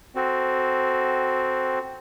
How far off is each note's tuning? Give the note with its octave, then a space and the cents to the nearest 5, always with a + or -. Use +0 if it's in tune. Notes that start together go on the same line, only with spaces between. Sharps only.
C4 +0 F#4 +5 A4 -5